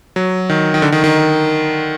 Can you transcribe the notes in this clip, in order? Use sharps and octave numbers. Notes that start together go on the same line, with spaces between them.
F#3
D#3
D#3
D3
D#3
D#3